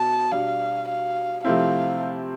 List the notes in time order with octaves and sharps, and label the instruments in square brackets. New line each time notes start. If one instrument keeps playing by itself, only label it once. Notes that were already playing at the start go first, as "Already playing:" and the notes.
Already playing: [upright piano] B2 B3 [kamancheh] A5
[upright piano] B2 G3 D4 [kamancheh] F5
[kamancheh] F5
[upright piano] C3 F3 A3 C4 E4 [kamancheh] F5